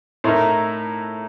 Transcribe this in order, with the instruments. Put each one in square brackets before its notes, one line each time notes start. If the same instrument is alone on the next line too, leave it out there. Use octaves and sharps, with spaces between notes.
[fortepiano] A2 A3 D#4 A#4